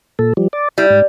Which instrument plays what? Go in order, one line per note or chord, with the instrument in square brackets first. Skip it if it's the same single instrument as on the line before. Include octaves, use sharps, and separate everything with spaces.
[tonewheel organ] A#2 A4
F3 G3
D5
[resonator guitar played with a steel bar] G3 [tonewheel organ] E4
[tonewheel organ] G#2